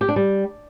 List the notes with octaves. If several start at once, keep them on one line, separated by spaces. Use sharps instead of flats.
G4
D4
G3